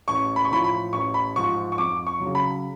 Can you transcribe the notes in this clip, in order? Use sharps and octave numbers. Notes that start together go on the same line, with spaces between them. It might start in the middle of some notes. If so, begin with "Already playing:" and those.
A1 C#6
B5
C#6
A2 F3 B5
B5
A1 C#6
B5
G#2 F3 C#6
C#6
F2 D6
C#6
F#3
C#3
B5